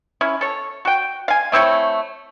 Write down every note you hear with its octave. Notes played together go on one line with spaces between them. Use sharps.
C#4 E4
A4 C#5
F#4 G5
F5 G#5
A3 C4 E4 C#5